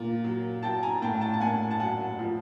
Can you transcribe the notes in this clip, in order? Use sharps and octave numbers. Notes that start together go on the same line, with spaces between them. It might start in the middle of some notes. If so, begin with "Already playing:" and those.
Already playing: A#2
F#3
F#3 G5 A5
G#5 A#5
A2 G5 A5
G5 A5
A5
A2 F#5 G#5
A5
F#3 F#5 G#5
F3